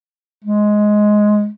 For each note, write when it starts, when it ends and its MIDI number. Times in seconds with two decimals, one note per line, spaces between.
0.44 1.48 56